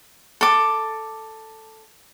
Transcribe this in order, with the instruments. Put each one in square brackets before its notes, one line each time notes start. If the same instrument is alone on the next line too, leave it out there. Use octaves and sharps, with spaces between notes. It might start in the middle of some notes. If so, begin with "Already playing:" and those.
[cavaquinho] A4 D6